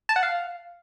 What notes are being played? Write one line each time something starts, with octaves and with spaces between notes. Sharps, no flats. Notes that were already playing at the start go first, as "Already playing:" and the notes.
A5
F#5
F5